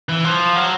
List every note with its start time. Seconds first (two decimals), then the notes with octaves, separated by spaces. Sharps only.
0.09 E3
0.25 F3
0.56 F#3